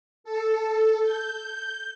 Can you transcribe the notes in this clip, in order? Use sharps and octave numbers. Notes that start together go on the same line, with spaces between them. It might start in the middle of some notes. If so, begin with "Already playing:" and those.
A4
G6